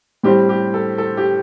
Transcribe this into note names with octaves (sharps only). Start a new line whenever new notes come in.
A2 G3 C4 G4
G4
A4
A4
G4